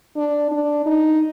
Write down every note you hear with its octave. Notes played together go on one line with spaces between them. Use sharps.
D4
D4
D#4